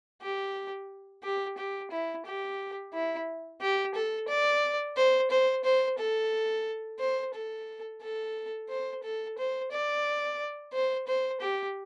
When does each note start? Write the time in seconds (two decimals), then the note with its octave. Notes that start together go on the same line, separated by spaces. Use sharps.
0.22 G4
1.23 G4
1.57 G4
1.91 E4
2.25 G4
2.93 E4
3.61 G4
3.95 A4
4.28 D5
4.97 C5
5.31 C5
5.64 C5
5.98 A4
7.00 C5
7.34 A4
8.02 A4
8.70 C5
9.04 A4
9.38 C5
9.71 D5
10.73 C5
11.07 C5
11.41 G4